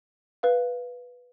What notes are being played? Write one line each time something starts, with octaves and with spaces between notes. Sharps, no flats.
B4 F5